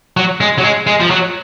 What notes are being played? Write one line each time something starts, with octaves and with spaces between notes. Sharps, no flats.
F#3
G#3
F#3
G#3
G#3
F3
F#3